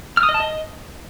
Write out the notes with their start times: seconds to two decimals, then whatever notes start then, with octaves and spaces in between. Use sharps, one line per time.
0.17 F6
0.23 D#6
0.29 D#5
0.34 A5
0.40 D#5